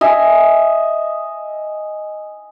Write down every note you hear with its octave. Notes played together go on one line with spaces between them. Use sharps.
D#5 E5 G#5